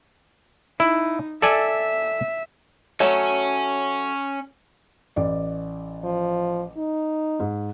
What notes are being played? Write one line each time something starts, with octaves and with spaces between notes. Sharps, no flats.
D#4 E4
A4 D5 E5 G#5
F#3 A3 C#4
A1 D5
F3
D#4
G#2